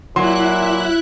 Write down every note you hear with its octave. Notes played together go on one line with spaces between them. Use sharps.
A#2 F#3 E4 C6 F#6